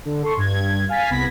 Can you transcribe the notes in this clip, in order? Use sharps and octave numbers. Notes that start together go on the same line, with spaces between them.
D3
A4 C6 C#6
G2 G#6
F5 G#5 A6 B6
C2 B3 B5 G#6 A#6 B6